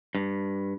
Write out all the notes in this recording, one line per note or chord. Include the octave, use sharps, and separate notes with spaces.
G2